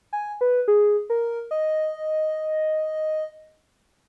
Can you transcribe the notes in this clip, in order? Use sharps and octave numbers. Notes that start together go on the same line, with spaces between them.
G#5
B4
G#4
A#4
D#5